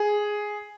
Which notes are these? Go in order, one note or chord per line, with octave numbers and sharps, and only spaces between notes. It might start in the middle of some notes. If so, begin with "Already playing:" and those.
Already playing: G#4